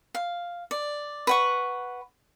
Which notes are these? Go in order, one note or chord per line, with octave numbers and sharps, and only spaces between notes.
F5
D5
B4 F#5 C#6